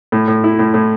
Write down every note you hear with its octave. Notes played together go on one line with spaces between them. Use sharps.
A2
A2
E4
A2
A2